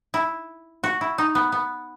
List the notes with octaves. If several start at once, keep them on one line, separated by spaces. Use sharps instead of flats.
E4
F#4
E4
D#4
B3
B3